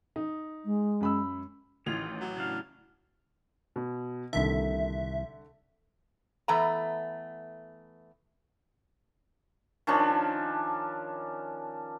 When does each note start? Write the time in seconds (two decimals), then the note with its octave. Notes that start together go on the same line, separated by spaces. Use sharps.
0.16 D#4
0.64 G#3
1.01 F#2 B5 E6
1.86 A1 D#3 E3 C#4 F4 F7
2.21 F#3
2.36 C#3 D4 F5
3.76 B2
4.33 C2 D3 D#3 A3 A4 E5
6.48 E3 A3 B3 A#5
9.87 D#3 F3 C#4 D4